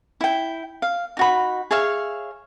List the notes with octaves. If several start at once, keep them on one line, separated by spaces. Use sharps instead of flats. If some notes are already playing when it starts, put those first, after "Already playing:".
E4 G5
F5
D#4 F#4 B5
G#4 C#5 E5 F5